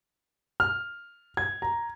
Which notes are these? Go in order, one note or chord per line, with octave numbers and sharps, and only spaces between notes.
F6
G#6
A#5